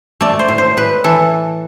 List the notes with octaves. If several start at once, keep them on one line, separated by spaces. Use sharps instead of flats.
A3 D5
C5
A2
C5
A2 B4
E3 A4